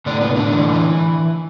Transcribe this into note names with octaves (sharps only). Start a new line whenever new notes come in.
A2 D3 D4
B3
A2
D3 D4
E3
E3